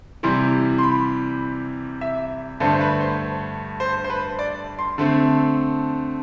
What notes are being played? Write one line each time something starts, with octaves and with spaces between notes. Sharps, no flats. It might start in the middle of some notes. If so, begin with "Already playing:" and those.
C3 E3 G3 C6
C6
B5
E5
G2 D3 A3 D4 C5
C5
B4
C5
C5
C5
B4
D5
C6
D3 A3 C4